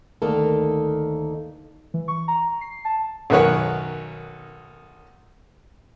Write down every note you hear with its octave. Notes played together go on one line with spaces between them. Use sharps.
D2 D#3 A#3 D#4 A4
E3
C#6
A#5
C7
A5
B1 F#2 D#3 B4 C#5 F#5